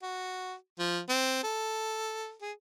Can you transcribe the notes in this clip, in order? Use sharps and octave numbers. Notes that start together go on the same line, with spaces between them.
F#4
F3
C4
A4
G#4